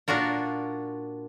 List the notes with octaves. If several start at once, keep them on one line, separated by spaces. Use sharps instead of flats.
A#2 D4 F4 F#4 A#4